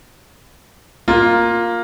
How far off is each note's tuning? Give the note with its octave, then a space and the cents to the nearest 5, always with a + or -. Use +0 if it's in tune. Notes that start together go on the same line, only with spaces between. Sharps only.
A#3 +0 F4 +10